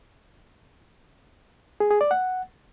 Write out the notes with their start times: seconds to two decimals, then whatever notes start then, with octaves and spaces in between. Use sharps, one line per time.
1.80 G#4
1.91 G#4
2.01 D5
2.11 F#5